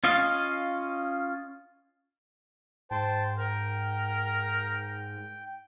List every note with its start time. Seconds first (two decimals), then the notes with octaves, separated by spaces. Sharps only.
0.04 C#4 F4 D#5 F5
2.91 G#2 C5 G5 A5
3.39 A#4 G5